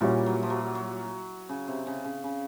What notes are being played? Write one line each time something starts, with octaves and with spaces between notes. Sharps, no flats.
A#2 E3 G3 A#3 C#4 F#4
F#3
F3
F#3
F#3
C#3
C3
C#3
C#3
C#3